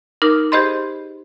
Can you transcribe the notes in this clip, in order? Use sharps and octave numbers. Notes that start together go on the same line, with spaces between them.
D#4 A#4 D6 F6
G4 G#4 C5 D#5 B5 C6